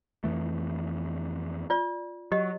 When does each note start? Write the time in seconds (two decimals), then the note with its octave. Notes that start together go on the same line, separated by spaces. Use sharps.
0.24 F2 E3 A3
1.70 F4 D5
2.32 F#3 G4 D#5